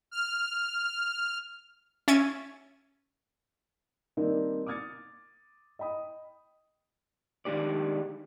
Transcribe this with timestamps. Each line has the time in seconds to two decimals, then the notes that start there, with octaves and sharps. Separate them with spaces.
0.11 F6
2.08 C#4 E5 G#6 A6 C#7 D#7
4.17 D#3 G3 A#3 C4 D4 D#4
4.66 D6 D#6 F6 G#6 A6 C#7
5.79 D#5 G5 B5 D#6
7.45 D#3 G#3 D4 G4 D5